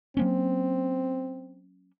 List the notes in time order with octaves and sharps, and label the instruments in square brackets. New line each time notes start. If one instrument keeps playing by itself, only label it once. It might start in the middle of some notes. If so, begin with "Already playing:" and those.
[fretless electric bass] F#3 A#3 C#4 [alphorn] C4